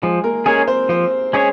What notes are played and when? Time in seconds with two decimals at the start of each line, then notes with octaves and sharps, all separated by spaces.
0.02 F3 G#3 G#4
0.24 A#3 A#4
0.46 G#3 A#3 C#4 G#4 A#4 C#5
0.58 A#4
0.68 C4 C5
0.89 F3 C4 C5
1.33 G#3 C#4 G#4 C#5